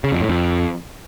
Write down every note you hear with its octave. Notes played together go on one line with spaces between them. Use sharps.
C#3
F2
A2
F2